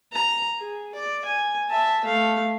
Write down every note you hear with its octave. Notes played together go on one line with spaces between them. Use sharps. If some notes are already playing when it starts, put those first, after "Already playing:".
A#5
G#4
D5
G#5
E5 A5
A3 F5